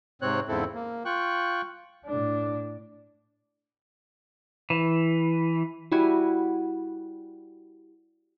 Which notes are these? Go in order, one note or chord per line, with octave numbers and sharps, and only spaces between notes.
G#2 C3 C4 C#5 F#6
E2 G#2 C#3 C4 E4 A4
A#3
F4 G5 C#6 F#6
A2 D4
E3
G3 E4 F#4 G#5